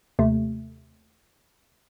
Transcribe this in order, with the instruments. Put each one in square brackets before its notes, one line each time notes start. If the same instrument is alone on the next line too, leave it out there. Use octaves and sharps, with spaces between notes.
[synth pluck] D#2 C3 A3